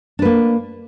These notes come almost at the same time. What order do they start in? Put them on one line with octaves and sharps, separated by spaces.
D4 B4 A#3